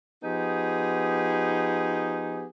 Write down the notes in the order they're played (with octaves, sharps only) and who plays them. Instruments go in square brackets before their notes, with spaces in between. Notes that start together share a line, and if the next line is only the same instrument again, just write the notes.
[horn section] F3 B3 D#4 G4 G#4